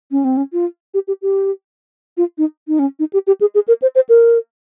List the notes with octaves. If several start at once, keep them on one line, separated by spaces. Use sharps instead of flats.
C#4
C4
C#4
F4
G4
G4
G4
F4
D#4
D#4
C#4
D#4
G4
G4
G#4
G#4
A#4
C5
C5
A#4